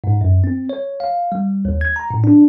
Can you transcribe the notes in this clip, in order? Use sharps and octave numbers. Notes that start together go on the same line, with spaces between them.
G#2
F#2
C4
C#5
F5
G3
D#2
G#6
A#5
A2
D4